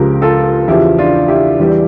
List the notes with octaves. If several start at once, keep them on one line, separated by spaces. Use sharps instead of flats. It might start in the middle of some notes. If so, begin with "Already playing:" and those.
Already playing: C#2 C#3 F3 G4 A#4
F4 A4
E2 C#3 F3 E4 G4
D4 F4
E4 G4
E2 E3 G3